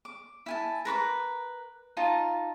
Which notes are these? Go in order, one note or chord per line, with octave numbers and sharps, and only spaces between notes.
D6
E4 G#5 A5
A#4 B4 C#6 D6
D#4 F4 A5